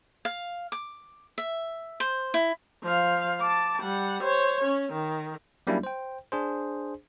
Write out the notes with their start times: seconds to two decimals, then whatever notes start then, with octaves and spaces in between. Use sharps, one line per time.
0.25 F5
0.72 D6
1.38 E5
2.00 C5
2.34 E4
2.83 F3 F5
3.40 A5 D6
3.82 G3 F#5
4.23 C5 C#5
4.64 C#4
4.93 D#3
5.67 F#3 G3 A#3 C#4 D4 E4
5.83 C5 G5
6.32 D4 G#4 C5